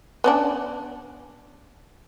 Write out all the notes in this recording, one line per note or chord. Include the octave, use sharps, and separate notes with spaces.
B3 C#4 D4